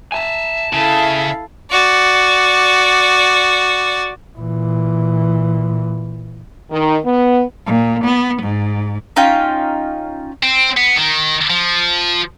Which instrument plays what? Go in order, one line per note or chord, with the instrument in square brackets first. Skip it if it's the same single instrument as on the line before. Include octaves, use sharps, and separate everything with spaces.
[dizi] E5 [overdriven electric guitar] G#5 A5
[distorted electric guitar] C#3 [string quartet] E4 A4 F5 [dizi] E5
[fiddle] F#4 D5
[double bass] A#2 E3
[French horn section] D#3
B3
[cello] A#2
B3
G#2
[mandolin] C#4 D#4 F4 G5
[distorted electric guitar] C4
B3
D#3
F3